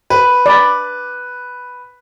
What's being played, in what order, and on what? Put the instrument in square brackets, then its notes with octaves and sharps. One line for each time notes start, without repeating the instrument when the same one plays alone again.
[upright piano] B4
[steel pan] D5 B5